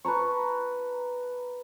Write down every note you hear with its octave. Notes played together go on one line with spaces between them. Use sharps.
B4 A5 A#5 C#6